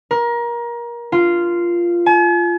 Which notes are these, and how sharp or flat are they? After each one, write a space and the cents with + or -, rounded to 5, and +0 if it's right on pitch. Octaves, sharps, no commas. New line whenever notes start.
A#4 +25
F4 -10
G#5 +45